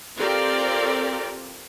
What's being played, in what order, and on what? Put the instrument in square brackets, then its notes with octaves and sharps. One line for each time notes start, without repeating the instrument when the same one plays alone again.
[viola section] C4 F4 G4 A4 A#4 D5